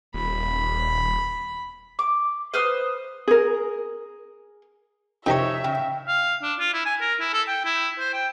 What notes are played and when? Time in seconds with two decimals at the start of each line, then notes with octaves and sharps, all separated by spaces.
0.14 D#1 B5
1.99 D6
2.54 B4 C5 D#6 F6
3.28 G#4 A#4
5.26 F2 C3 D#4 A#4 C#5 E5
5.64 C#3 G5
6.08 F5
6.43 D4
6.59 F4
6.73 E4
6.86 G#5
7.01 A#4
7.20 E4
7.33 A4
7.48 G5
7.65 E4
7.99 C5
8.14 G5